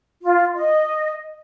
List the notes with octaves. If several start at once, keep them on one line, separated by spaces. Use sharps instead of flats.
F4
D#5